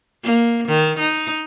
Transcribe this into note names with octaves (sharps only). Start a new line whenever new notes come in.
A#3
D#3
D#4